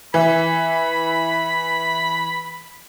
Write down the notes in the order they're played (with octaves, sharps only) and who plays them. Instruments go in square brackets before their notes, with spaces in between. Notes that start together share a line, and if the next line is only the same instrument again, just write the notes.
[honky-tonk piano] E3 E4 [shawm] B5